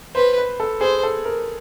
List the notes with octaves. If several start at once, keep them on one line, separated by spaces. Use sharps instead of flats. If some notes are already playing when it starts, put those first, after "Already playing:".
B4 C5
B4
A4
G#4 C5
A4
A#4